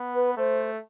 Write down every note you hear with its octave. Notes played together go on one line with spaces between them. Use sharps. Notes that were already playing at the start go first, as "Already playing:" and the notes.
Already playing: B3
B4
A3 C5